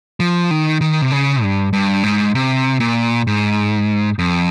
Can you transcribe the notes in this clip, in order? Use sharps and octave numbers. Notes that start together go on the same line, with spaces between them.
F3
D#3
D#3
C3
C#3
G2
G2
G#2
C3
A#2
G#2
F2